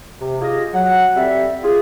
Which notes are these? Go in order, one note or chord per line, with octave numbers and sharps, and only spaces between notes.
C3
F4 G4 G#4 D#5
F#3 F#5
G3 C4 A4 E5
F4 G#4